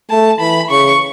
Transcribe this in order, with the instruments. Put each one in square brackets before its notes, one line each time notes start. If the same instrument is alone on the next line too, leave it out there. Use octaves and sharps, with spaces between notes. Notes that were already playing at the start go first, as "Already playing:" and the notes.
[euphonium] A3 [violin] A5
[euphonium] E3 [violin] B5
[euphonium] C#3 [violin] C#6